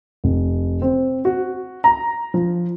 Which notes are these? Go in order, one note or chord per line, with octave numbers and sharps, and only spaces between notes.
F1
C4
F#4
A#5
F3